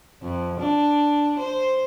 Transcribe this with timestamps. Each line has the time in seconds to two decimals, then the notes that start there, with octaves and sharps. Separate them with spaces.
0.22 F2
0.60 D4
1.39 C5